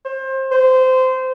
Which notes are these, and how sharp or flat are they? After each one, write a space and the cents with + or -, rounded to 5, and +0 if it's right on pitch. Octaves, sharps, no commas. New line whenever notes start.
C5 +25
C5 -20